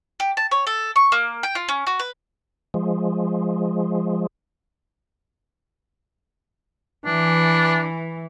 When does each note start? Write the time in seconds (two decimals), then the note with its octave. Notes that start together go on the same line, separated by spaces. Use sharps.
0.20 G4
0.37 A5
0.51 C#5
0.67 A4
0.96 C#6
1.12 A#3
1.43 G5
1.55 F4
1.69 C#4
1.87 F#4
2.00 B4
2.74 F3 G#3
7.06 E3 D4